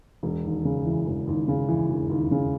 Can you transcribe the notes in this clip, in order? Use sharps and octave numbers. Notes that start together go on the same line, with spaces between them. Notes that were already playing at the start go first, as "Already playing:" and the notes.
E1
D#2
C#3
E3
E1
D#2
C#3
E3
E1
D#2
C#3